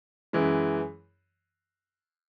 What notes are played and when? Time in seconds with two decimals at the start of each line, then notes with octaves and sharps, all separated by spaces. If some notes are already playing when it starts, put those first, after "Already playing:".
0.33 F#2 E3 G#3